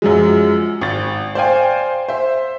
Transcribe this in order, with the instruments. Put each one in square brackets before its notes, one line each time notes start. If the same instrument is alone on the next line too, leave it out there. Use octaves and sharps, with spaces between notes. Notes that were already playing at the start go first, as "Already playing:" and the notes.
[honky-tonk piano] F#2 F3 F#3 G#3
G#1 A6
C5 D5 F5 G5 G#5
C5 E5